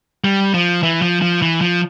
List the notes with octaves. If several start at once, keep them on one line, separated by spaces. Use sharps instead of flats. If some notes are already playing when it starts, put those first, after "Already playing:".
G3
F3
E3
F3
F3
E3
F3